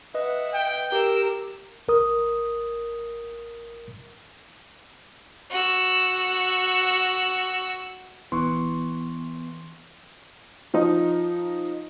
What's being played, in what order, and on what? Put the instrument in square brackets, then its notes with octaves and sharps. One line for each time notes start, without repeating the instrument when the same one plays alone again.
[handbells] B4 D#5 [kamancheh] E5 F#5
[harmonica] G5
[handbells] G4 [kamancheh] A#4 E6
[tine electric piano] A1 A#4 D#6
[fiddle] F#4 E6
[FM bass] D#1 [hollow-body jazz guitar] E3 [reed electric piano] B3 [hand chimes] C6 C#6
[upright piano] F3 D#4